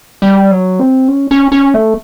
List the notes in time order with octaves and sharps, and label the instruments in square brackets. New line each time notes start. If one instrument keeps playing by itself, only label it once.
[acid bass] G3
F#3
C4
C#4
C#4
C#4
A3